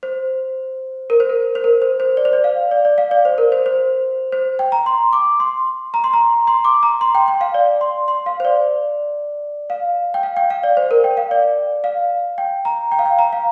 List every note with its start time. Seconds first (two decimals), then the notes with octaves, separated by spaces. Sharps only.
0.03 C5
1.10 A#4
1.20 C5
1.30 A#4
1.55 C5
1.64 A#4
1.82 C5
2.00 C5
2.17 D5
2.25 C5
2.33 D5
2.44 F5
2.71 D5
2.85 D5
2.98 F5
3.11 D5
3.25 C5
3.38 A#4
3.52 C5
3.66 C5
4.32 C5
4.59 G5
4.72 A#5
4.86 C6
5.13 D6
5.40 C6
5.94 A#5
6.04 C6
6.13 A#5
6.47 C6
6.65 D6
6.83 A#5
7.01 C6
7.15 G5
7.28 G5
7.41 F5
7.54 D5
7.81 C6
8.08 C6
8.26 F5
8.40 C5
8.45 D5
9.70 F5
10.14 G5
10.23 F5
10.37 G5
10.50 F5
10.63 D5
10.77 C5
10.91 A#4
11.04 G5
11.17 F5
11.31 D5
11.84 F5
12.38 G5
12.65 A#5
12.92 G5
12.99 F5
13.05 G5
13.19 A#5
13.33 F5